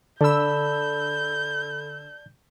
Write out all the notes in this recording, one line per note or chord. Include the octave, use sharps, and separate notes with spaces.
D3 A4 D5 A5 B5 E6 G6